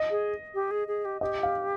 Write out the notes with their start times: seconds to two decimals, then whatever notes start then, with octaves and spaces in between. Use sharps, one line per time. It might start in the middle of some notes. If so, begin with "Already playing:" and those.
Already playing: D#5
0.10 G#4
0.54 G4
0.71 G#4
0.88 G#4
1.05 G4
1.21 G4 D#5
1.43 F5